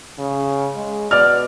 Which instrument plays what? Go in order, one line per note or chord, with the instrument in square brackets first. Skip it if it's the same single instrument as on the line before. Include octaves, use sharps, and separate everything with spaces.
[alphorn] C#3
G#3
[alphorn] B2 [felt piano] D5 F6